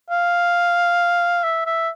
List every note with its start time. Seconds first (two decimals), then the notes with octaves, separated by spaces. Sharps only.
0.10 F5
1.43 E5
1.66 E5